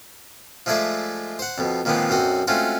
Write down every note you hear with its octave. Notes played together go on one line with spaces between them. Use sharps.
F3 G#3 A3 G#4 D5 E5
C5 F#5
F2 B2
A#2 D#3 F3 G#3 B3 C4
B1 F#2 C4 F#4 D#5
G#3 A3 C4 C#4 F4 F#4